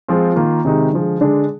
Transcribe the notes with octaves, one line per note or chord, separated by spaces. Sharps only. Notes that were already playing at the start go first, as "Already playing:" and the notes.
F3 G#3 C4 F4
D#3 A#3 F4
C3 D#3 G#3 D#4
D3 F3 G#3
D3 G#3 D4